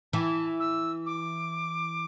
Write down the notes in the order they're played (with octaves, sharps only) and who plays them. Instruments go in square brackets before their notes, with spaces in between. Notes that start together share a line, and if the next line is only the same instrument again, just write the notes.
[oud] E3 [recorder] A5
[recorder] E6
D6